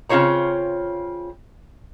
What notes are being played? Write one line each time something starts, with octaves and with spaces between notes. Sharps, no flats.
C#3 C4 F4 C5 C#5 A#5